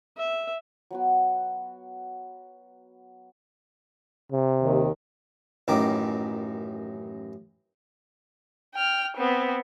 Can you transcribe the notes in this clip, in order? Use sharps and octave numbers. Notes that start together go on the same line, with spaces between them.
E5
F#3 B3 F#4
C3
D#2 D#3
A1 F#2 D#3 D6
G5 F6
B3 C4